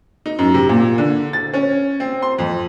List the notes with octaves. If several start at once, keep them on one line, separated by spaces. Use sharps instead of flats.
D#4
F#2
C3
A#2
D3
A6
C#4
C4
C6
F2